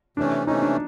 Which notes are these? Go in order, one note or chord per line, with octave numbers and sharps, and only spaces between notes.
C3 E3 A3 C#4 D4
C3 E3 A3 C#4 D#4
D4